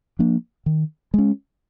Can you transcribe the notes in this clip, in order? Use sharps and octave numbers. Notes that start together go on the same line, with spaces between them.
F3 A#3 D4
D#3
G#3 C#4